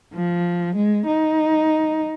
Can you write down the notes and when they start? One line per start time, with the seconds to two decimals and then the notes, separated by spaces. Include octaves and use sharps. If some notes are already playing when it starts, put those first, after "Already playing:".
0.14 F3
0.76 G#3
1.07 D#4